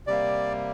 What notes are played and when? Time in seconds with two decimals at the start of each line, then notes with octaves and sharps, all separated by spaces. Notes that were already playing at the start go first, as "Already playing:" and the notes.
0.07 C3 G3 A#3 D5